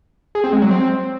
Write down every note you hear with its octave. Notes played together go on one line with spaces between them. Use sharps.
G#4
C4
G#3
F#3
C4